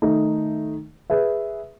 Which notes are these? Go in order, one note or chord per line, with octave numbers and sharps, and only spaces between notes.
D#3 A3 D#4
G#4 B4 E5